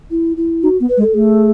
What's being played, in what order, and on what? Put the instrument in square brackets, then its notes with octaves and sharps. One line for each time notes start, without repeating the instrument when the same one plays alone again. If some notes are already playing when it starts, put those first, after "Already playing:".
[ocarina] E4
E4
[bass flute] D#4 [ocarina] F#4
[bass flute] B3
[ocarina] B4
[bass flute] G#3
[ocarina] A4
[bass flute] A3 [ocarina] G#4